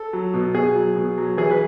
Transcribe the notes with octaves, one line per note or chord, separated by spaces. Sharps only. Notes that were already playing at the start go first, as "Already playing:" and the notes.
Already playing: A4
F#3
B2
B2 G#4
F#3
B2
F#3
E3 G#4
B4